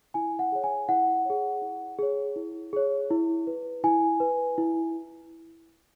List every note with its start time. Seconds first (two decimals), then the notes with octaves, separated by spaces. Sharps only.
0.14 E4 G#5
0.39 F#5
0.52 G#4 C#5
0.64 G#5
0.88 E4 F#5
1.25 G#4 C#5
1.62 E4
1.99 G#4 C#5
2.36 E4
2.73 G#4 C#5
3.11 E4
3.47 B4
3.84 E4 G#5
4.20 B4
4.58 E4